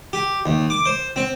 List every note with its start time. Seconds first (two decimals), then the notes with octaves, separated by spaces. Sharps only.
0.13 G4
0.46 D#2
0.70 D6
0.86 C5
1.16 C4